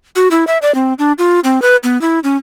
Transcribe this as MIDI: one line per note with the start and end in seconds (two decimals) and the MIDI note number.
0.16 0.28 66
0.31 0.44 64
0.47 0.58 76
0.62 0.74 74
0.75 0.93 60
0.99 1.12 62
1.18 1.40 65
1.44 1.62 60
1.62 1.76 71
1.83 2.00 59
2.01 2.19 64
2.24 2.37 61